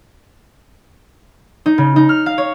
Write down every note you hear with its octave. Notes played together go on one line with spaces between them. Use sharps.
D#4
C#3
D#4
F6
F5
C#5